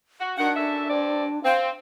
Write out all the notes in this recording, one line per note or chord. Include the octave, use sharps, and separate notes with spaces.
F#4
D#3 D4 F#4 F#5
F#2 A4 E5
G2 C4 D5
C4 F5